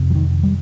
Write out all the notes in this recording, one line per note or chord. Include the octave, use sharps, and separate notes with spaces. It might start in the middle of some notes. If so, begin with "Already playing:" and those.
Already playing: F2 C3
F3
D#3
G3